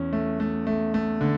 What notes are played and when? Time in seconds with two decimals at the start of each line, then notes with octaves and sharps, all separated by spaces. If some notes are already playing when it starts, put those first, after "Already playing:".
Already playing: E2 C#4
0.13 A3
0.40 A3
0.67 A3
0.94 A3
1.21 D3